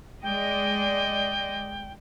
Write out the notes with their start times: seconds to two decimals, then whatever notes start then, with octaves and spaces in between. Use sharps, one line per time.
0.23 G#3 D5 D#5 G5